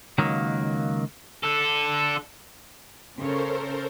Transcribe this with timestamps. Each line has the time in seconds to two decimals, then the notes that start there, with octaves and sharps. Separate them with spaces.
0.18 C#2 D#3 F#3 A#3
1.44 D3 A4
3.19 C#3 C#4 A4 A#4 C5 C#5